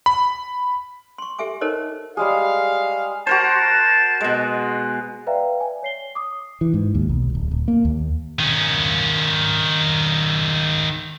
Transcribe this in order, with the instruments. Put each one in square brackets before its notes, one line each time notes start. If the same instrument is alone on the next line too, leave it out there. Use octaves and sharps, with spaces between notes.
[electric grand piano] B5
[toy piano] C6 C#6
G4 A4 E5 G#5 D6
D#4 A4 A#4 C5 C#5 D#5
[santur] G3 G#3 G#4 [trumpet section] F5
[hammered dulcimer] F#4 A#4 C5 [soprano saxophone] A5
[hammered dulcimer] B2 G#3
[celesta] B4 D5 E5 F5 G5 A#5
G#5
C#5 C7 G7
D6 D#6
[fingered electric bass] E3
G#2
D#2
B1
D1
D1
A#3
D#2
[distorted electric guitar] D#3 C#4